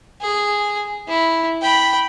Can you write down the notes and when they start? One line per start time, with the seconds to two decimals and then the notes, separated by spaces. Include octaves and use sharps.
0.21 G#4
1.08 E4
1.62 G5 B5